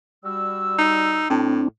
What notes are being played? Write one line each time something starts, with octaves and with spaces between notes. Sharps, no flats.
G3 F#4 E6
D#4
A2 C4 D4